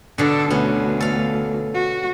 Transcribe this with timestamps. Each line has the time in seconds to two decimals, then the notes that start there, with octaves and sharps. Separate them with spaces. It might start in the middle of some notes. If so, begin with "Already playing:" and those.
0.18 B2 D3 D4 A4
0.50 D2 B2 B3 C#4
1.00 A4 F5
1.74 F#4